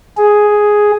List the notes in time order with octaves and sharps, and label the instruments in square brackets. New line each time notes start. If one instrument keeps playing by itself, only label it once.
[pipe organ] G#4